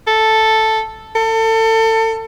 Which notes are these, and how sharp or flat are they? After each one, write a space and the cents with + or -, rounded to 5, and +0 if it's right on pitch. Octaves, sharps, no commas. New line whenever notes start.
A4 +0
A4 +30